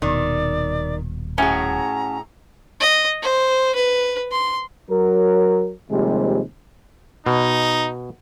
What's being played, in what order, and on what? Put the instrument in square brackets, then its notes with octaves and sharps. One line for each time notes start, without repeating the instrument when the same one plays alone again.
[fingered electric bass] D#1 B2 [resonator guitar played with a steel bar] D#3 [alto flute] D5
[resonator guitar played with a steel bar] A2 G#4 [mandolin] C#4 F#4 [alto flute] A#5
[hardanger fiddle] D#5
C5
B4
C6
[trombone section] F#3 A#4
D#2 C3 F3 G3 G#3
[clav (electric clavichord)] B2 [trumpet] D#4